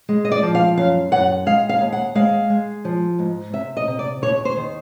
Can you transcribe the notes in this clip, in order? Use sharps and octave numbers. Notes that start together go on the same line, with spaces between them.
G#3
D#5
D5
F3
F5
F#2 F5
F#2 F#5
G#3 F5
F5
D#2
F#5
G#3 F5
G#3
F3
G#2
C3 E5
D#5
C3
D5
D#2 C#5
C5
D#3